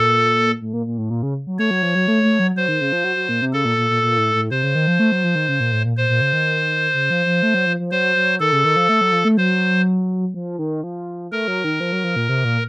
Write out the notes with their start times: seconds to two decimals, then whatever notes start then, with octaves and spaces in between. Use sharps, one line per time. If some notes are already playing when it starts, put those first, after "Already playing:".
Already playing: A#2 A4
0.61 A2
0.73 A#2
0.86 A#2
0.98 A2
1.10 A#2
1.23 C#3
1.47 F#3
1.59 A3 C#5
1.71 F#3
1.83 F3
1.95 F#3
2.08 A3
2.23 A3
2.39 F#3
2.56 F#3 C5
2.68 D#3
2.81 C#3
2.92 F3
3.04 F#3
3.16 F#3
3.29 A#2
3.42 C3
3.53 C#3 A4
3.65 A#2
3.77 A#2
3.90 A#2
4.03 A#2
4.18 A2
4.34 A2
4.51 C3 C5
4.63 C#3
4.75 D#3
4.87 F3
4.99 A3
5.12 F#3
5.24 F3
5.35 D#3
5.49 C#3
5.60 A#2
5.72 A2
5.85 A#2
5.97 A#2 C5
6.09 A#2
6.21 C#3
6.33 D#3
6.94 C#3
7.10 F3
7.26 F3
7.43 A3
7.54 F#3
7.67 F3
7.80 F3
7.91 F#3 C5
8.16 F#3
8.40 D#3 A4
8.53 C#3
8.65 D#3
8.76 F3
8.89 A3
9.01 F#3
9.12 F3
9.25 A3
9.37 F#3 C5
10.34 F3
10.59 D#3
10.83 F3
11.32 A3 A#4
11.48 F#3
11.64 D#3
11.80 F3
11.92 F#3
12.04 F3
12.16 A#2
12.29 C3
12.44 A#2